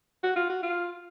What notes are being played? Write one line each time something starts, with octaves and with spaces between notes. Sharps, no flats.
F#4
F4
F#4
F4